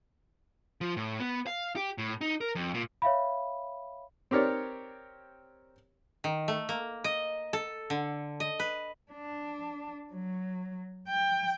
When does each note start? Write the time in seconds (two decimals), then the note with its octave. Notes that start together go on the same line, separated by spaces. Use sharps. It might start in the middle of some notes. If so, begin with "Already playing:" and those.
0.81 F3
0.97 A2
1.20 B3
1.47 F5
1.76 G4
1.98 A2
2.21 D#4
2.41 A#4
2.55 F2
2.74 A#2
3.02 C#5 E5 F5 B5
4.31 C4 G4 A#4 C#5 D5
6.24 D#3
6.48 A3
6.69 A#3
7.04 D#5
7.53 A4
7.90 D3
8.40 D#5
8.59 B4
9.12 D4
10.14 F#3
11.08 G5